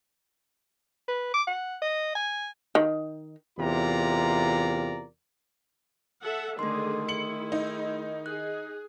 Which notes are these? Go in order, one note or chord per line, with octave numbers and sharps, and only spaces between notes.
B4
D6
F#5
D#5
G#5
D#3
E2 C3 F4 A#4 D5 A#5
A4 E5 F#5
D3 D#3 G#3 A3 G#4 C6
E4 G#4 C#7 F#7
D#4
G#4 F#6